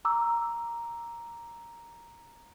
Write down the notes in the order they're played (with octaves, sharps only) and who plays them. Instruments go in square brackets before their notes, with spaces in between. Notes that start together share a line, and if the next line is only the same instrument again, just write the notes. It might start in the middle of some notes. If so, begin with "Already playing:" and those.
[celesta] A#5 D6 E6